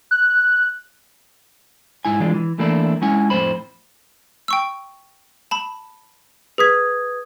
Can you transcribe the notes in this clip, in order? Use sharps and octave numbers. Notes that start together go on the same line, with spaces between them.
F#6
G#2 E4 G#5
E3 G#3 D4 F4
E3
E2 E3 A3 A#3 D4 E4
G#3 C#4 E4 F#5 G#5
F2 A2 C5 B5
G5 C#6 E6
A5 B5
G#4 B4 D#6 G#6 B6